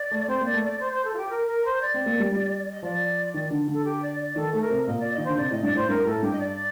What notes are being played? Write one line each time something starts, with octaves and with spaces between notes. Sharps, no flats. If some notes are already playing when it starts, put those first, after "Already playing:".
Already playing: D5
A3
C4 C5
A#3 D5
A3
D5
C5
C5
A4
F4
G4
A#4
A#4
C5
D5
C4
A#3
G3
G3
D#5
F3 D5
D#3
D3
D3
A4
G4
D5
D5
D#3 A4
A3 A4
A#4
C3
A#2 D#5
D5
D#5
D#3
D3 C5
C3 D5
A2 D#5
G2 D5
A2 C5
G2 A#4
A2 A4
G2 G4
D#5
D5